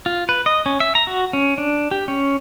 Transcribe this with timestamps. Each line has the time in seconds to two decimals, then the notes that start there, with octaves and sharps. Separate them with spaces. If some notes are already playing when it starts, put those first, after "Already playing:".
0.06 F4
0.29 B4
0.46 D#5
0.66 C#4
0.80 E5
0.95 A#5
1.07 F#4
1.33 C#4
1.58 D4
1.91 G4
2.08 C#4